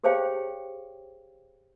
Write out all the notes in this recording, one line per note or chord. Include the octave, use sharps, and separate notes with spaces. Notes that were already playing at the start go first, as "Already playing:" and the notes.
G4 G#4 C5 C#5 F5 G5